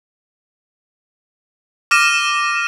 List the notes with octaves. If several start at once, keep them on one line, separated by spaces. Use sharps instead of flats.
D6 F6 A#6 D#7 E7